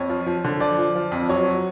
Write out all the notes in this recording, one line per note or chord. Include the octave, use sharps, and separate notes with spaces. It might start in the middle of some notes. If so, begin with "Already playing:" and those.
Already playing: F2 C#5
F3
F3
D3
F3 D5
F3
F3
F2
F#3 C#5
F#3